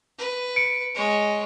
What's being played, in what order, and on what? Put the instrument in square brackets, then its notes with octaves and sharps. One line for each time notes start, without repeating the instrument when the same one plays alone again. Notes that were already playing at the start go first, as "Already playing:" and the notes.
[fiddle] B4
[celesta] C#7 D7
[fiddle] G#3 C#5